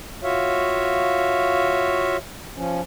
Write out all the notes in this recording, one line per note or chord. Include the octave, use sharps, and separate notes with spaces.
F4 F#4 C#5 E5 F5
F3 C#4